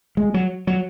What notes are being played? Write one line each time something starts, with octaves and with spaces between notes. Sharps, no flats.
G#3
F#3
F#3